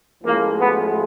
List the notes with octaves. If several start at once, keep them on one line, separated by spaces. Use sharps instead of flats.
A1 A2 F3 G#3 A#3
B3